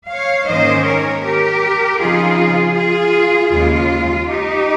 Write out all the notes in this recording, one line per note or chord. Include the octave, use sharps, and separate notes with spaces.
C#5 F5
G#2 D#3 A#3 C#4 C5 D#5
A#4 C#5
G4 A#4
C#3 F3 C4 D#4 F4 G#4
F4 G#4
D#2 C#3 G#3 F4
D#4 G4